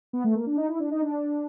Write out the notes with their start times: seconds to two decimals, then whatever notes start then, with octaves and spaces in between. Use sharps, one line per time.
0.13 B3
0.24 A3
0.35 A#3
0.46 D4
0.57 D#4
0.69 E4
0.80 D4
0.91 D#4
1.02 D4